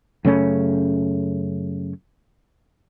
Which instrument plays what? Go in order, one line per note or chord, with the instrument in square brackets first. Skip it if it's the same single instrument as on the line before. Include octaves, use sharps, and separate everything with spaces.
[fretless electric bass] F#2 C#3 A3 C#4